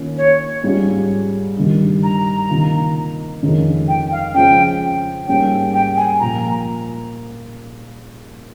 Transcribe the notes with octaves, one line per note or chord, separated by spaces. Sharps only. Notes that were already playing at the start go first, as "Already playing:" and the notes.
Already playing: D#3 A#3 C#4 F4
C#5
G#2 G3 C#4 F4
G2 D#3 G3
A#5
C3 D#3 A#3 F4
F2 D#3 G#3 C#4 F4
G5
F5
C#3 F3 G#3 C4 G5
G#2 G3 A#3 C#4 G5
G5
G#5
A#2 F3 A#3 F4 A#5